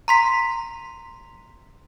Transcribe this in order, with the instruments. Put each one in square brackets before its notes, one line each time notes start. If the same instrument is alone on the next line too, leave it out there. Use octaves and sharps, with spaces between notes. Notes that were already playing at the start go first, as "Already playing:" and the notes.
[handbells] A#5 C6 B6